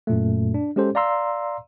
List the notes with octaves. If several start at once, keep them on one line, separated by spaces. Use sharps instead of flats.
F#2 A#2 A3
D4
G#3 C#4 G4 A4 C5
D5 F5 A#5 C6 E6